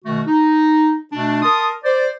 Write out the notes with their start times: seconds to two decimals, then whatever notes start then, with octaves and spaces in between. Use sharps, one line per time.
0.05 B2 D#3 A3 F#4
0.27 D#4
1.12 B2 A3 D4
1.42 A#4 A5 C6 D#6
1.84 C5 D5